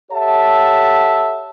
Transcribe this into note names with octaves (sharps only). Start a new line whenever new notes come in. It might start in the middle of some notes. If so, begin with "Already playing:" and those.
G4 A4 C#5 E5 F#5 A5